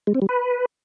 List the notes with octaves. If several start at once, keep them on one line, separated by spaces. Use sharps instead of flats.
G#3
C4
G3
B4